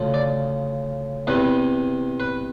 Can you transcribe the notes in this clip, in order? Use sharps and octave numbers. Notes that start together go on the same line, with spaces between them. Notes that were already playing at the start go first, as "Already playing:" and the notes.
Already playing: D2 C#3 F3
D5
E2 C3 E3 B4
B4